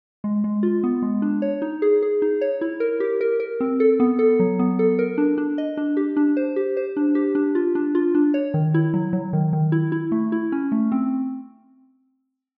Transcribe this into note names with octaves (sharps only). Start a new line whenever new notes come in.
G#3
G#3
F4
B3
G#3
D4
C#5
D#4
G#4
G#4
D#4
C#5
E4
A#4
G4
A#4
A#4
C4
A4
B3
A4
F#3
B3
A4
A#4
D4
D4
D#5
D4
G4
D4
C5
G4
C5
D4
G4
D4
F4
D4
F4
D4
C#5
D#3
E4
F#3
F#3
D#3
D#3
E4
E4
A3
E4
C#4
A3
C4